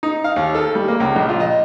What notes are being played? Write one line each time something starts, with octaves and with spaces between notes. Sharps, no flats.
D#4
F5
D#2
A4
G3
A#3
C#2
A#1
F4
D#5